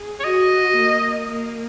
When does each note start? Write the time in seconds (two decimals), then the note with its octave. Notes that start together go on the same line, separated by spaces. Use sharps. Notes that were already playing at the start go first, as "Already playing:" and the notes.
Already playing: G#4
0.20 C#5
0.24 F#4 D#5
0.77 A#3
1.30 A#3